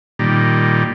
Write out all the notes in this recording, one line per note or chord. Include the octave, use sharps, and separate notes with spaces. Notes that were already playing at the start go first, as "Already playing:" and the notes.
A#2 D#3 G3